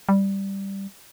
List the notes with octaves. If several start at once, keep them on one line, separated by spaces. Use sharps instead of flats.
G3